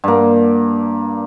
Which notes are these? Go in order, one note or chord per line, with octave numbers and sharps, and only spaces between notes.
G2 A#3